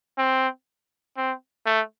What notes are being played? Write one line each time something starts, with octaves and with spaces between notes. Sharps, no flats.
C4
C4
A3